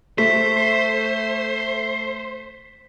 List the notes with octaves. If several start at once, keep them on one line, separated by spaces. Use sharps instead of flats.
A3 C5 B6